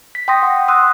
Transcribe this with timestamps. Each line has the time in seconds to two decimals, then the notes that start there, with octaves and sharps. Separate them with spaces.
0.15 B6
0.28 G5 C6 D#6 A#6
0.43 F#5
0.68 C6 D#6 E6 F#6